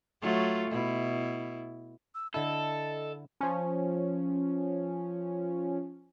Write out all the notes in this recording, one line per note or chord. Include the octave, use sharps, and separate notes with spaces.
F#3 A3 F4
B2 E4
E6
D3 E4 A4 D#5
F3 C#4